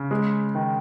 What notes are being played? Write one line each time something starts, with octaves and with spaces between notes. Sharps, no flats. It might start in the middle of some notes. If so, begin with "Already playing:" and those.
Already playing: C#3
G#3
D#3